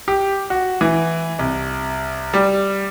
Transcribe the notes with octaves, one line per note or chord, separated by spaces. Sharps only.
G4
F#4
E3
C2
G3